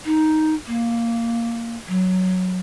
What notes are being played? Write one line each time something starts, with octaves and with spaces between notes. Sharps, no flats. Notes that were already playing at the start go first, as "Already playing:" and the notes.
D#4
A#3
F#3